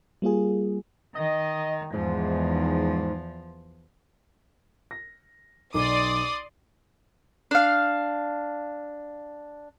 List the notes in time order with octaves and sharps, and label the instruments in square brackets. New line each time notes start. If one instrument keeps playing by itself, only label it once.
[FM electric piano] G3 A#3 F4 G#4
[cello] D#3 [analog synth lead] D#5
[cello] E2 F3 [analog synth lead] G#2
[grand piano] A#6
[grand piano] B1 [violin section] D5 C6 D#6 [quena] D6
[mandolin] D4 F5